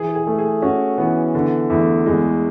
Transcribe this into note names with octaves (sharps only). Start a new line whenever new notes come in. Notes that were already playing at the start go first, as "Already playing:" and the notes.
Already playing: E3 G#4
G#4
A3
G#4
C#4 F#4
E3 B3
D3 B3
E2 A3
E2 G#3